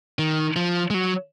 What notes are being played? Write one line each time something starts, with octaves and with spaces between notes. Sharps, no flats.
D#3
F3
G#3
F#3